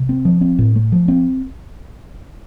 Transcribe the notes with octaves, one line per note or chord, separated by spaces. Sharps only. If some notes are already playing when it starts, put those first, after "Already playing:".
Already playing: C3
C4
F3
C4
A2
A3
F3
C4